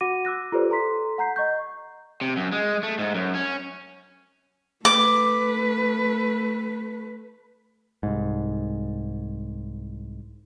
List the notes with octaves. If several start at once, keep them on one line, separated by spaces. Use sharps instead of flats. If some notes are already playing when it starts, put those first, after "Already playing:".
F#4 F#5 D6 A#6 D#7
D6 E6 F#6 A#6
F4 G4 A4 B4 C5 D5
A4 A#5 C6 B6
F#5 A#5 G6 C7
D#5 C#6 G6
C3
F#2
G#3
A3
G#2
F#2
C#4
A3 B4 D6
C2 G#2